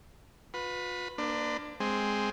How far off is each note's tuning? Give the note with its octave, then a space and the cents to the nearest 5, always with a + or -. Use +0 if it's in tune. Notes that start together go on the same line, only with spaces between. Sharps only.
F4 +40 B4 +0
A#3 +10 D4 +20 C5 -40
G#3 +0 C4 +0